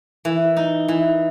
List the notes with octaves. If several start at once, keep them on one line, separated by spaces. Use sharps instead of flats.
E3
D#4
E3